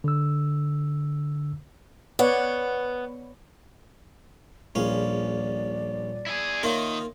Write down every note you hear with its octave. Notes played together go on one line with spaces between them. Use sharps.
D3 E6
B3 C#5 D5 F#5
D#1 A#1 C#4 G#4 D5 F5
E4 G#4
D#3 A#3 D#4 F4 C#5 E5